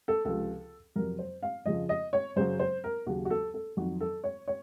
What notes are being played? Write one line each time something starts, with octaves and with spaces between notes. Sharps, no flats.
A4
C#2 C3 F3 A4
F2 C3 F#3 A#4
C5
F5
F2 C#3 F3 D#5
D#5
C#5
F#2 C#3 F#3 C5
C5
A#4
D#2 C#3 F#3 F#4
F#4
A4
A4
F2 D#3 F#3 F#4
A4
C#5
C#5